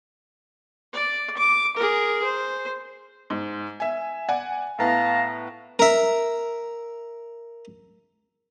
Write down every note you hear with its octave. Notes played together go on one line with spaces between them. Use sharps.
D5
D6
G#4 A#4
C5
G#2
E5 G#5
D5 F#5 G#5
A2 B3 F5 A5 A#5
A#4 E5